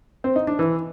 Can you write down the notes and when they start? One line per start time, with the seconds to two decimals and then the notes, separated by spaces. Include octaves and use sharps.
0.24 C4
0.36 D#4
0.47 D4
0.59 E3